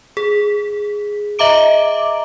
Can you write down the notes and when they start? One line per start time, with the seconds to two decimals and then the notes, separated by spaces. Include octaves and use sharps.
0.17 G#4
1.39 D#5 E5 A#5 D6 D7